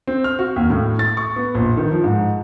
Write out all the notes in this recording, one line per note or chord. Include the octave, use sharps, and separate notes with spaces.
C4
F6
F#4
D#2
A2
A6
C#6
B3
A#1
D#3
F3
G#2